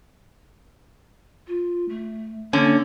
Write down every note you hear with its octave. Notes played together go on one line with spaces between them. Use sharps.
F4
A3
D3 A#3 C#4